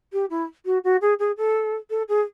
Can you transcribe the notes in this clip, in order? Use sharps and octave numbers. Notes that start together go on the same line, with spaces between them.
G4
E4
F#4
F#4
G#4
G#4
A4
A4
G#4